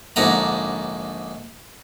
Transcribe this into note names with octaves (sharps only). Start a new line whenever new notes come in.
A#1 G#2 D3 F#5 A#5